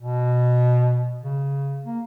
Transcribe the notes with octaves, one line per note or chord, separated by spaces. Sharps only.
B2
C#3
A#3